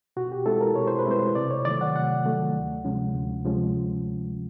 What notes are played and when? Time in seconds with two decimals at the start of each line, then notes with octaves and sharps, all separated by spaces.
0.17 B2 F#4
0.32 G4
0.46 G#3 C4 E4 A4
0.61 A#4
0.76 B2 C#5
0.87 C5
0.99 B4
1.06 G#3 C4 E4 C5
1.35 C3 D5
1.51 C#5
1.65 D#3 F#3 A3 D5
1.81 F#5
1.95 C3 F#5
2.25 D#3 F#3 A3
2.55 D2
2.85 C3 F3 G#3 C#4
3.15 D2
3.45 C3 F3 G#3 C#4